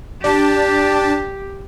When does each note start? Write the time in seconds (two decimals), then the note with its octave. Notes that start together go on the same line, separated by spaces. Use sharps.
0.24 D4 G4 A5